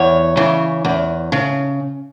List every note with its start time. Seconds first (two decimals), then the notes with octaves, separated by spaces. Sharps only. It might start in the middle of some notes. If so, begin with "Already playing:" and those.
Already playing: E2 C#5
0.37 C#3 E3
0.85 E2
1.32 C#3